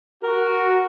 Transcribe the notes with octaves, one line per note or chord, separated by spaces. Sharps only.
F#4 A#4